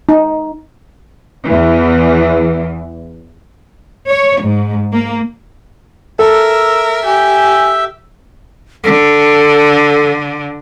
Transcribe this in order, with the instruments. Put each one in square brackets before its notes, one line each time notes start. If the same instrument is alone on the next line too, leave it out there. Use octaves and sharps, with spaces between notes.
[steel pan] D#4
[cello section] E2 E3
C#5
G#2
A#3
[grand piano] A4 [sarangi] A#4 [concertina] E5 E6
[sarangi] G4 [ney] G#5
[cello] D3 [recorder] A4